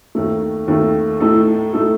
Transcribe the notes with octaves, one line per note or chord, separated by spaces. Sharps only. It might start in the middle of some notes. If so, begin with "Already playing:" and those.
D#2 D#3 A3
D#2 D#3 A3
A2 A3 D#4 A4
A2 A3 D#4 A4